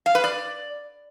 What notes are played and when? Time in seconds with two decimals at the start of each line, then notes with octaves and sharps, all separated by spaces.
0.06 F5
0.15 B4
0.24 D5